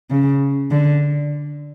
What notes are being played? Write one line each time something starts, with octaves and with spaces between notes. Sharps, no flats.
C#3
D3